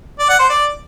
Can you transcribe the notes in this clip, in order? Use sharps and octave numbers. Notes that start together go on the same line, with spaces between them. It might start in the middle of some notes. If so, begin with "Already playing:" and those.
D5
F#5
C5
D5